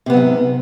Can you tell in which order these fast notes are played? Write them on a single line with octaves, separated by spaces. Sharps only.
C3 B3 F#3 G#2